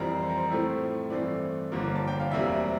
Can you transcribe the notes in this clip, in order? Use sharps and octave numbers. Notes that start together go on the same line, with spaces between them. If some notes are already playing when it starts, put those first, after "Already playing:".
Already playing: F2 E3 G3 C4 A#4
C5
A#4
C5
A2 F3 A3 C4 E4
G2 E3 A3 C4 D5
G1 G2 D3 F3 A#3
A5
G5
F5
E1 D2 C3 G3 A#3 E5